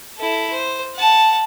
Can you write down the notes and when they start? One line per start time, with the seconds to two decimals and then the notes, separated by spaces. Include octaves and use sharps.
0.16 E4 A4
0.53 C5
0.95 F#5 A5